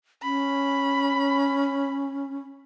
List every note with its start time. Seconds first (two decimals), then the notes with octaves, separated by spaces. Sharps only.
0.22 C#4 B5